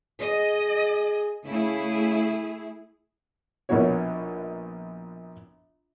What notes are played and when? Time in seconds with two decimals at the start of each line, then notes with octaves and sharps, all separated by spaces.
0.21 G#4 D#5
1.45 C#3 A3 E4 G#4
3.69 A#1 B2 A#3 E4 F#4 C#5